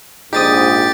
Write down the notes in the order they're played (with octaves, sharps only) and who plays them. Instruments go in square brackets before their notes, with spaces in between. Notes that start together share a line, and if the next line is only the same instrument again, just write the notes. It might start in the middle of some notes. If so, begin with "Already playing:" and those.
[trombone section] A#1 G#2 [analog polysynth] D#4 C5 D#6 [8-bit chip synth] G4 A6